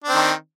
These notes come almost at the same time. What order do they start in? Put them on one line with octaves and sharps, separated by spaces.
D4 C4 D#3